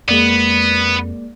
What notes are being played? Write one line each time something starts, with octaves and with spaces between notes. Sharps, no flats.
F2 G#3 A#3 B3 D5